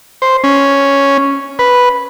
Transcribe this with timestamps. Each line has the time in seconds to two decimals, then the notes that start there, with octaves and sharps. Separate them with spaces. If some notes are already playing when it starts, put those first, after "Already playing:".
0.22 C5
0.44 C#4
1.59 B4